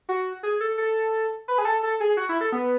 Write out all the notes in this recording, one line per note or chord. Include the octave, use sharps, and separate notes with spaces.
F#4
G#4
A4
A4
B4
G#4
A4
A4
G#4
F#4
E4
A4
B3